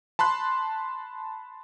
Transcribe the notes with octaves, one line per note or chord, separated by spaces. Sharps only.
A5 B5 C6 F#6